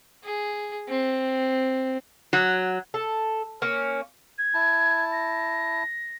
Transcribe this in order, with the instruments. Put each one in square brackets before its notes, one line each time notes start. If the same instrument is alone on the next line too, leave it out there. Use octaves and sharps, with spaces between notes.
[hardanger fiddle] G#4
C4
[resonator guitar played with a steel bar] F#3
[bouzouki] A4
A#3 C#4
[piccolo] G#6
[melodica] E4 A5
[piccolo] A#6